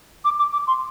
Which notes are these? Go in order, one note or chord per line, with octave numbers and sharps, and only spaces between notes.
D6
D6
D6
C6